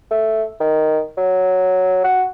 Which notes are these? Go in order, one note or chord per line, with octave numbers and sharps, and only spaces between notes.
A3
D#3
F#3
F#4